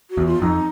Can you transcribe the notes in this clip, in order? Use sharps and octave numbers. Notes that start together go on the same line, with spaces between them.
F#4
E2
F4
F2 D#4